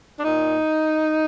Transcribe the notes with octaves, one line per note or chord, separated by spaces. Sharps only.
D4
A#2 D#4